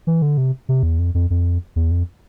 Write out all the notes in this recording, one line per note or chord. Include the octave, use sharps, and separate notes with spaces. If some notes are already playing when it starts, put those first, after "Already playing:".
E3
D3
C3
C3
E2
F2
F2
F2
E2
F2